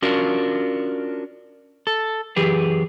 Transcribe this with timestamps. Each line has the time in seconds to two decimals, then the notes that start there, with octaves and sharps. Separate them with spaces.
0.02 C#4 D4 F4 F#4 A#4
1.87 A4
2.36 F#2 E3 G4 G#4 B4